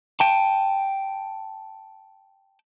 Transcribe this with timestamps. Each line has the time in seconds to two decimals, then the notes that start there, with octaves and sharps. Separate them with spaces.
0.20 G5 A5